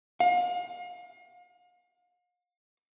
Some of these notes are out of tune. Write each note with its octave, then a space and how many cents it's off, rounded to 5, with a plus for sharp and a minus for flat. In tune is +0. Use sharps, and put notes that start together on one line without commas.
F5 +40